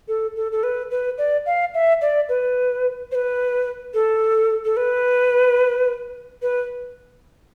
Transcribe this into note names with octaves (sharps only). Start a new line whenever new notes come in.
A4
A4
A4
B4
B4
D5
F5
E5
D5
B4
C5
B4
A4
A4
B4
B4